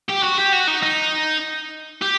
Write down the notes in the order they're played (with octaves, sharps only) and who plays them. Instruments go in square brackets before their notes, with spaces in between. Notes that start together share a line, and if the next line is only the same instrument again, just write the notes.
[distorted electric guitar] G4
F#4
G4
F#4
D#4
D#4
G4